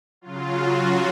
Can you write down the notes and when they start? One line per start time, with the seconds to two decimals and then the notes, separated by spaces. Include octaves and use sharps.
0.21 C#3 F#3 F4
0.54 F#4